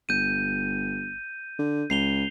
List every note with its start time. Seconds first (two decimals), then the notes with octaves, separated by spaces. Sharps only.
0.09 G1 G6 D#7
1.59 D3
1.90 C#2 C7 F7 G7